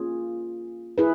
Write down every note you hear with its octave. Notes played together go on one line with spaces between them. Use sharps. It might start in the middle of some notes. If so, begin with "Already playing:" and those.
Already playing: A#3 C#4 F4 G#4
E4 G#4 B4